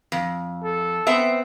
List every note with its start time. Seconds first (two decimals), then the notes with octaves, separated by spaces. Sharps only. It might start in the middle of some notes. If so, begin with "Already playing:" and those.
0.12 F2
0.63 A4
1.07 B3 C4 E5